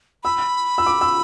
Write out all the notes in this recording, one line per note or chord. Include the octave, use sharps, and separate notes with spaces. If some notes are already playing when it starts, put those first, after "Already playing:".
B5 E6
E6
D6
E6